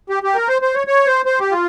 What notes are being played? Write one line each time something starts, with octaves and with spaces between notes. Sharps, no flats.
G4
G4
A#4
C5
C5
C#5
C#5
C5
C5
G4
F4